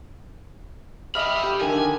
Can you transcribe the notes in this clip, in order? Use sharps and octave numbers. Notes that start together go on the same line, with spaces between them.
D#5 E5 G5 B5 F6
G4
D3 D#3 G#5